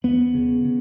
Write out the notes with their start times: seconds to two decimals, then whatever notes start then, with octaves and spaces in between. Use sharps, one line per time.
0.04 E2 B3
0.34 C#3
0.65 C#3